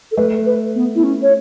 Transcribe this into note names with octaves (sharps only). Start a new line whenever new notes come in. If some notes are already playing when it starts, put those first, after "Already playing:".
A4
A3 B4
B4
B3
E4
C#4
C#5